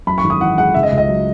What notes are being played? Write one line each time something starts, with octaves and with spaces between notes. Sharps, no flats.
F#2 B5
C#6
G#1
D#6
E3 F#5
G#3 F#5
C#3 E5
D#5
C#2
D#5
F#3